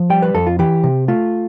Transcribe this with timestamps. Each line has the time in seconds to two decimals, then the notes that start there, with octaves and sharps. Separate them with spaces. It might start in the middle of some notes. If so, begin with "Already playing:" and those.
Already playing: F3
0.10 G3 G5
0.22 B4
0.34 F2 A4
0.46 F4
0.59 E3 G4
0.84 C3
1.08 A3 F4